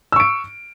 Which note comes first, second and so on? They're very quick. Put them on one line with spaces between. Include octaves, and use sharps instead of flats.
E6 C#6 D7